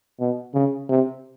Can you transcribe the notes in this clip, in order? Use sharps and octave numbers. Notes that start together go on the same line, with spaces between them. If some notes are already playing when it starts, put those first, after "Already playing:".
B2
C#3
C3